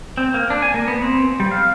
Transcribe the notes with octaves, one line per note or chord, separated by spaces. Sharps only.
C4
A#3
D4
G#5
A#3
B3
C4
G3
F5